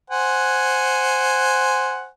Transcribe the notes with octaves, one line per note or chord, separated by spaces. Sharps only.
C5 F#5 G#5